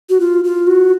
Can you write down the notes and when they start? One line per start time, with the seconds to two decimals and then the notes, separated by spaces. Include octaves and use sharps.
0.10 F#4
0.20 F4
0.44 F4
0.67 F#4